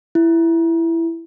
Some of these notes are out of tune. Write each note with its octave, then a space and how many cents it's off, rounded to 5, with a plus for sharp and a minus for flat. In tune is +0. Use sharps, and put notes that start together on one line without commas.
E4 +10